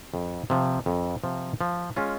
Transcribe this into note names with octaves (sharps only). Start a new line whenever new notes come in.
F2
C3 F3
F2
C3 F3
F3
G#3 C#4 F4